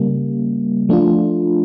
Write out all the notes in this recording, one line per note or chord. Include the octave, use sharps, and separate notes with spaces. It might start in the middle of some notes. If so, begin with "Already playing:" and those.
Already playing: C#3 G3 A#3
F3 A3 D4 F4